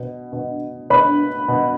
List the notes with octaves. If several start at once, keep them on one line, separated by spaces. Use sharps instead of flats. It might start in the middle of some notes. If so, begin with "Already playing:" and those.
Already playing: B2
B2
B2 B4 B5
B2